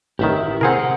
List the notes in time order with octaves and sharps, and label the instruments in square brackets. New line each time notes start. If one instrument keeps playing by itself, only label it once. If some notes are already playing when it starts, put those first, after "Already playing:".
[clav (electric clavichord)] A1 D#3 [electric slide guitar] E4 G4
[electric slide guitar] C3 F#5 [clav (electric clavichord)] C4 G#4 A#4